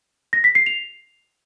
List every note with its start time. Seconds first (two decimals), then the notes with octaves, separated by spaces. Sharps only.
0.33 A#6
0.44 B6
0.55 C7
0.66 F7